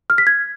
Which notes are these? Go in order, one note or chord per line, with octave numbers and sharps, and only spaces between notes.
F6
B6
G#6